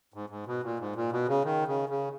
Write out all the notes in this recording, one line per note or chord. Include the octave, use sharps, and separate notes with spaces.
G#2
G#2
B2
A#2
G#2
A#2
B2
C#3
D#3
C#3
C#3